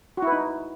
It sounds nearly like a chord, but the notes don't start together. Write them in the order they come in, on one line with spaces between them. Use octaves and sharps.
F#4 E4 B4 D#4